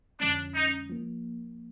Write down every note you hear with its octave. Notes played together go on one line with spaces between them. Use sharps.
F2 D3 F3 G#3 C#4 D4
D#4
F3 A#3